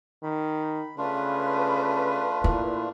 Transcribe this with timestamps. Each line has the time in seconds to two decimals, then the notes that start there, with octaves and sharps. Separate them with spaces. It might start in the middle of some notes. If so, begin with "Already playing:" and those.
0.23 D#3 B5
0.98 C#3 A3 D4 F4 B4
2.44 A#2 E4